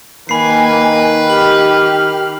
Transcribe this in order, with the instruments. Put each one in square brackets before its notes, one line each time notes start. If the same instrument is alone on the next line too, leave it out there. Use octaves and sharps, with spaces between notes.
[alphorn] D#3 [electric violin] A#3 G#5 [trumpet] B4 [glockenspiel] B5 C7
[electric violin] G4 F6 [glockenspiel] F#7